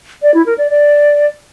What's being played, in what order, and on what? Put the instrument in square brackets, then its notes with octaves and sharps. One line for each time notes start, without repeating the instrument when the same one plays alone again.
[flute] D5
E4
A#4
D5
D5